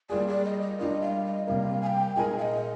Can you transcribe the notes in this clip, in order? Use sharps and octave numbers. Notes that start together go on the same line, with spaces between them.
G3 A#3 F4 G#4 D5
D5
D#5
D#5
G3 D4 F4 A#4 D#5
F5
D#5
C3 G3 A#3 F5
G#5
G5
A#2 G#3 D#4 A#4 G#5
F5
D#5